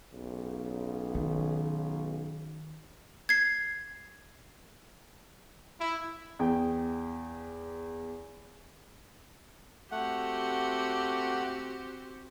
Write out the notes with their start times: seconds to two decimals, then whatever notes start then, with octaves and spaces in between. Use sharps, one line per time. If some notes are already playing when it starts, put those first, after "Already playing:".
0.14 B1 C#3
1.15 D#3
3.29 G#6 C7
5.80 E4
6.39 E2 G5
9.92 A3 C4 F#4 G4 F#5